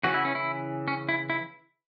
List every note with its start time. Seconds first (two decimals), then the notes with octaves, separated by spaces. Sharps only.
0.04 C#3 E3 C#4 F#4
0.14 E4
0.25 C#4
0.35 E4
0.88 C#4
1.09 E4
1.30 E4